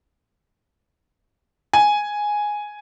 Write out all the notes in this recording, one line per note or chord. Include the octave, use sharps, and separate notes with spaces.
G#5